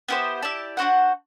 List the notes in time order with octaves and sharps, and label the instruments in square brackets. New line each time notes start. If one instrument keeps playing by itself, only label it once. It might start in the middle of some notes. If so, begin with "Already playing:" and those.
[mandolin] B3 E4 G4 C5
E4 G4 D5 A5
D4 F#4 C5 F#5